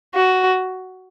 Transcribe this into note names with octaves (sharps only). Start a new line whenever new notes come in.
F#4